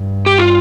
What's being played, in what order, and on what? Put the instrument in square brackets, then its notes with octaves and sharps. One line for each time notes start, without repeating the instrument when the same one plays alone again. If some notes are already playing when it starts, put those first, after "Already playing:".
Already playing: [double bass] G2
[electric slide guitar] G4
F4